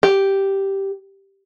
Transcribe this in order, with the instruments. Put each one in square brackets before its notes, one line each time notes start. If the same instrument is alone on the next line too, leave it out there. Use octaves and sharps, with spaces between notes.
[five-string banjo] G4